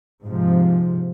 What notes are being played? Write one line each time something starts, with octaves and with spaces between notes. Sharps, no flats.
G#2 C3 F3